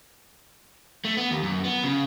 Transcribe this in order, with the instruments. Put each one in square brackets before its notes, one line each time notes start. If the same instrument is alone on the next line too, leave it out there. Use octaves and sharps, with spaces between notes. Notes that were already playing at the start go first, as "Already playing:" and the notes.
[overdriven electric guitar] A3
B3
D#2
F#2
B3
C#3